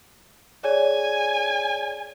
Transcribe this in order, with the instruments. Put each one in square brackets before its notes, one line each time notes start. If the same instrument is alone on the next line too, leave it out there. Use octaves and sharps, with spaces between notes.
[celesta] G#4 C#5 D5 [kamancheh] G#5